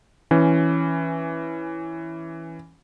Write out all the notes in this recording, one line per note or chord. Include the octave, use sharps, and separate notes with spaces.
E3 C#4